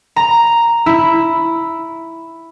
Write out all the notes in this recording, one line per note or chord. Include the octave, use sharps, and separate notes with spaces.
A#5
E4